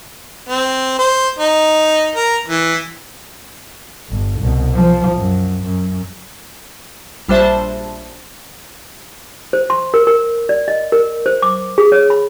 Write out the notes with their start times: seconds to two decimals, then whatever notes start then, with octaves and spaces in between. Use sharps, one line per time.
0.49 C4
0.99 C5
1.39 D#4
2.16 A#4
2.48 E3
4.10 G1
4.40 C2 B2
4.75 F3
5.17 F#2
5.64 F#2
7.29 A#1 G3 D4 C5 E5 A5
9.53 C5
9.70 C6
9.94 A#4
10.07 A#4
10.49 D5
10.68 D#5
10.92 A#4
11.26 C5
11.42 D6
11.78 G#4
11.92 C#5
12.10 B5